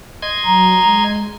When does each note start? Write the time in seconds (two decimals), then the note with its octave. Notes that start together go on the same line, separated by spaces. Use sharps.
0.22 D#5 C6 G#6
0.45 F#3 A#5
0.84 G#3